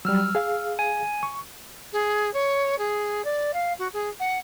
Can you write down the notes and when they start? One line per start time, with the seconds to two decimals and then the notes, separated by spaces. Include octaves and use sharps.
0.05 F#3 G3 E6 F6
0.35 G#4 F5
0.79 G#5
1.23 C#6
1.93 G#4
2.34 C#5
2.78 G#4
3.25 D5
3.54 F5
3.79 F#4
3.93 G#4
4.20 F#5